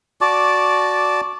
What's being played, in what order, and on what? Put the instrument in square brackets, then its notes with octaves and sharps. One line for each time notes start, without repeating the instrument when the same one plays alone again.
[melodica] F#4 D5 A5 D6